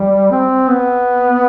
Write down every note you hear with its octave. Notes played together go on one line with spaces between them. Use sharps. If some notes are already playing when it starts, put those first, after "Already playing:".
Already playing: G3
C4
B3